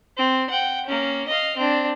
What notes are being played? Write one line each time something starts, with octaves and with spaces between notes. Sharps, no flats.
C4
F#5 G5
A#3 C#4
D#5 F5
C4 D4